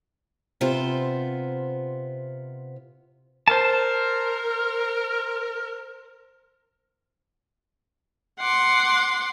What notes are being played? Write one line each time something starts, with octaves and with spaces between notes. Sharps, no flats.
C3 B3 F4 C5
A#4 C5 A5
F#5 C6 D6